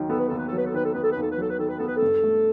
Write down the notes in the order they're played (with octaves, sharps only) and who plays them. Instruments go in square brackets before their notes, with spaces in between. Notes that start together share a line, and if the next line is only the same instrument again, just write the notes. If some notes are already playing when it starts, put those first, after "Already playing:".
Already playing: [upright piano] D#2 D#3 F#3
[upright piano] B3 [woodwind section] A4
[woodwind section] B4
[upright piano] D#2 [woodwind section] A4
[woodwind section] B4
A4
[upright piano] F#3 [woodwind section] B4
[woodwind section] A4
[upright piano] D#3 [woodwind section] B4
[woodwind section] A4
[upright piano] B3 [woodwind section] B4
[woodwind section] A4
[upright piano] D#2 [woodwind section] B4
[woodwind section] A4
B4
[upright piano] F#3 [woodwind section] A4
[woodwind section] B4
[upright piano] D#3 [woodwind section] A4
[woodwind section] B4
[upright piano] B3 [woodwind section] A4
[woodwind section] B4
A4
[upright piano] G2
A3